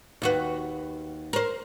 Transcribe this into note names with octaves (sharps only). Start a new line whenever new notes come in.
D#2 F#4 B4
A#4 C5